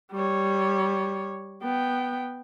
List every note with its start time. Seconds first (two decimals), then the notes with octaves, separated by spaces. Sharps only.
0.12 G3 C#5
1.63 B3 G5